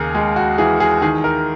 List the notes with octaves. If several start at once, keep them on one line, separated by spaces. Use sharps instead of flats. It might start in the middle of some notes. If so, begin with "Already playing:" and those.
Already playing: D#2 C#3 G#4 A#4
G#3 G#4
F#4
E3 G#4
G#4
D#3 G#4
A#4